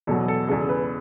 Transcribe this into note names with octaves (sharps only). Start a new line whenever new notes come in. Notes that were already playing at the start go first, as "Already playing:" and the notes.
E2 B2 F#3 A4
A4
E2 C#3 G#3 A4
B4